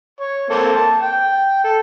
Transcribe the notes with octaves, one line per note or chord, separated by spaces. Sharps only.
C#5
A#3 C4 A4
A5
G5
A4